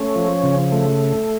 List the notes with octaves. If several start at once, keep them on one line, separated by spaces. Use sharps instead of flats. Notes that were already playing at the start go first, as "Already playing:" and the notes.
Already playing: A3 C#4
F3
C#3
A3